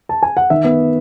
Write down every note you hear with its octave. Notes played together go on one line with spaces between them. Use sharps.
A5
G#5
F#5
D#3 E5
B3